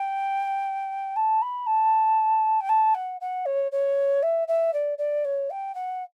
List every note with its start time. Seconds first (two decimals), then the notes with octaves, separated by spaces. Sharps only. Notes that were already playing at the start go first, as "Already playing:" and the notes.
Already playing: G5
1.16 A5
1.41 B5
1.66 A5
2.60 G5
2.69 A5
2.94 F#5
3.20 F#5
3.45 C#5
3.71 C#5
4.22 E5
4.47 E5
4.73 D5
4.98 D5
5.24 C#5
5.50 G5
5.74 F#5